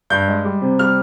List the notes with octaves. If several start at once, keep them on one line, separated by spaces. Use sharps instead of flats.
G2 G6
G#3
G3
C3
G3 F6